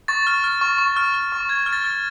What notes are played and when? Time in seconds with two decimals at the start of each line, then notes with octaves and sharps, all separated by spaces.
0.08 C#6 A6
0.27 F6
0.44 F6
0.61 C#6
0.78 C#6
0.96 F6
1.14 F6
1.32 C#6
1.49 C#6 G#6
1.66 F6
1.73 A6
1.84 F6